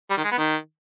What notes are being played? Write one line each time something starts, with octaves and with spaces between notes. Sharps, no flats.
G3
D#3
G#3
B3
D#3